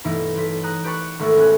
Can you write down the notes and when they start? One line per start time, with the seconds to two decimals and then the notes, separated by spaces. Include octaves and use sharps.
0.04 G2 B2 E3 A3 D#4 E4
0.36 B1 B6
0.63 A#5 D#6 F#6
0.84 G4 B4 A5 C#6 F#6
1.19 G#1 G#3 A3 A4 E5 C#6
1.36 B1 C#4 F#6